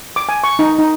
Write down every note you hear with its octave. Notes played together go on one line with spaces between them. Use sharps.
D6
G#5
C#6
D#4
D#4